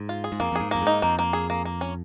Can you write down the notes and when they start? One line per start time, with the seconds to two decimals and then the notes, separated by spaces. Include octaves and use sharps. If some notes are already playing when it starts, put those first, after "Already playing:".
Already playing: G#2
0.09 F4
0.24 G#4
0.32 G#2
0.40 F2 A#3
0.52 F2
0.55 G#2 G#4
0.71 F2 A#3
0.82 G#2 D#4
1.02 F2 A#3
1.19 A#3
1.33 G#4
1.50 A#3
1.65 A#3
1.81 C#4